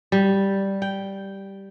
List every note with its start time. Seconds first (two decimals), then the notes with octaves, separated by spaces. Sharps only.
0.12 G3
0.82 G5